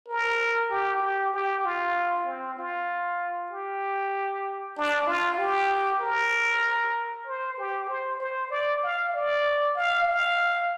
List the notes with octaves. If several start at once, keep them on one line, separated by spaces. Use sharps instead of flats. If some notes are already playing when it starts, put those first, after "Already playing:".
A#4
G4
G4
G4
F4
C4
F4
G4
D4
F4
G4
A#4
C5
G4
C5
C5
D5
F5
D5
F5
F5